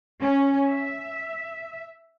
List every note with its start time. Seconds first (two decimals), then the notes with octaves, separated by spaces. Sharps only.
0.21 C#4
0.69 E5